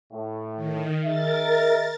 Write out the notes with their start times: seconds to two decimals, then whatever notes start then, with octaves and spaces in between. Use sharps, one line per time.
0.13 A2
0.56 D#3
1.05 G#4 A#4 D#5 E5 A6